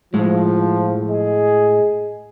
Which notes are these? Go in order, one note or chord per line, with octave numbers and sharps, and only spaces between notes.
A2 F3 G#3
G#4 D#5